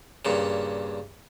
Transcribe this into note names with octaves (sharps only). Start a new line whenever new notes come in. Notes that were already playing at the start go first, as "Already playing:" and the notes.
G2 A#2 C#3